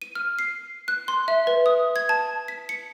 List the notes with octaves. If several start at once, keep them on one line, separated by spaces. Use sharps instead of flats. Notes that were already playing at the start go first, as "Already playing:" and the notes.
D#7
F6
C7
F#6
C6
E5
B4
D#6
G#6
A5
B6
C#7